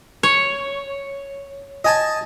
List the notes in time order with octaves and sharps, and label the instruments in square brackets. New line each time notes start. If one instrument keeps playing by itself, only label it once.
[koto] C#5
[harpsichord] D#5 G#5 A5